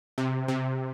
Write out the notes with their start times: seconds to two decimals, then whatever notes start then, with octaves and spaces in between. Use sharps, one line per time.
0.18 C3
0.48 C3